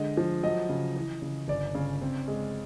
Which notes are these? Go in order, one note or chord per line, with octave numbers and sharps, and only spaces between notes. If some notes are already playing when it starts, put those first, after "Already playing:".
Already playing: D3 G#3 D#5
F3
F#3 D#5
C#3
E3
C#3
G1 D5
C#3
C4
G#3